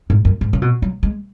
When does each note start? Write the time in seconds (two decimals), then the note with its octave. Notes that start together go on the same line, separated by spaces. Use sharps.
0.10 G#2
0.25 F#2
0.41 G#2
0.53 C#3
0.62 B2
0.82 F#3
1.03 G#3